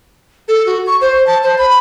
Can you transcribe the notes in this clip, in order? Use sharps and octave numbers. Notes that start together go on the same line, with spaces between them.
A4
F#4
C#6
C5
A5
C5
B5